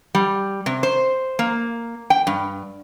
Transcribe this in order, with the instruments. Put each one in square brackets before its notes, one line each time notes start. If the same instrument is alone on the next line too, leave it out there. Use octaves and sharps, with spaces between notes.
[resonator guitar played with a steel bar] G3
C3
C5
A#3
G5
G2